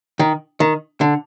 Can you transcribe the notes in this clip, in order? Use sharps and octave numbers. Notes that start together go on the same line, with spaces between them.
D#3
D#3
D3